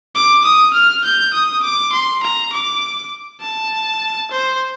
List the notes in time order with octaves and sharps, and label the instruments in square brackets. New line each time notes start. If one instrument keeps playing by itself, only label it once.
[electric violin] D6
D#6
F6
G6
D#6
D6
C6
A#5
D6
A5
C5